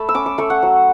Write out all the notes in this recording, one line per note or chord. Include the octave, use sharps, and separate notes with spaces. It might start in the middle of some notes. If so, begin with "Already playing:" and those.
Already playing: A3 A5 B5
E6
C#4 D6
D6
A3 C#6
F#5
F#3